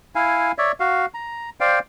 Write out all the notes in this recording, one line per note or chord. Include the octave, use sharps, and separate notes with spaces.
E4 F5 G#5
C#5 D5 E5
F#4 F5
A#5
C5 D5 F5 G5